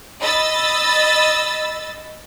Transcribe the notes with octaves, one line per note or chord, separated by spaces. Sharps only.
D#5 B5 E6 A6